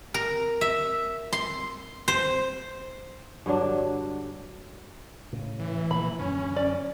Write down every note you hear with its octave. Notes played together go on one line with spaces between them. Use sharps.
A#4
E5
C6
C5
G2 D3 F#3 D4
A2 C#3
E3
A#2 F3 B5
F#2 D3 C#4
D5